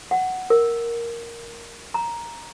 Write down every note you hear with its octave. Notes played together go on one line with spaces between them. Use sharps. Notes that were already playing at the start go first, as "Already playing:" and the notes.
F#5
A#4
A#5